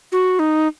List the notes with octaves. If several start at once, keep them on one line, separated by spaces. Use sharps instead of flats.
F#4
D#4